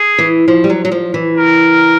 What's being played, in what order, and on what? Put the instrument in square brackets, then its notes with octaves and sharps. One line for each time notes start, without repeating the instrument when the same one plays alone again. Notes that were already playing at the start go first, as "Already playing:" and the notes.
Already playing: [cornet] G#4
[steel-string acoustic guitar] E3
F3
G3
F#3
F#3
F3
E3
[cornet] A#4